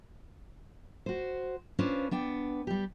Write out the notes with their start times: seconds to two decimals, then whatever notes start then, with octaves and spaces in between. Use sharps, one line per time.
1.06 F#4 C5
1.79 C#4 D4 F4 B4 C5
2.11 B3 D4 G5
2.67 G3 G4